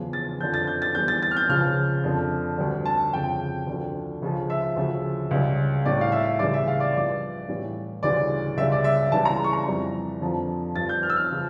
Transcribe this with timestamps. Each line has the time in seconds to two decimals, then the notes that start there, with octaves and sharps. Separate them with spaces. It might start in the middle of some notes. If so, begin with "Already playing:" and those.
Already playing: E2 C#3 F3
0.13 A6
0.40 F3 G6
0.43 F2 D3
0.54 A6
0.67 G6
0.82 A6
0.95 E2 E3 G3 G6
1.08 A6
1.23 A6
1.31 F6
1.37 G6
1.49 C#2 C#3 F3 F6
2.03 F2 D3 F3
2.58 D2 D3 G3
2.86 A5
3.12 F2 C#3 F3 G5
3.67 D2 D3 F3
4.22 C#2 C#3 F3
4.50 E5
4.76 D2 C#3 F3
5.31 C#2 C#3 G3
5.85 A2 G3 D5
6.01 F5
6.12 E5
6.39 C#2 C#3 E3 G3 D5
6.54 E5
6.68 F5
6.80 D5
6.95 G2 F3 D5
7.49 A2 E3 G3
8.03 D2 C#3 E3 G3 D5
8.57 C#2 C#3 G3 E5
8.72 D5
8.84 E5
9.12 C#2 C#3 E3 G3 A5
9.25 A#5
9.44 C#6
9.53 A#5
9.67 F2 E3 G3
10.21 F2 D3 F3
10.76 G2 F3 A6
10.89 G6
11.03 F6
11.10 E6
11.16 F6
11.32 C#3 F3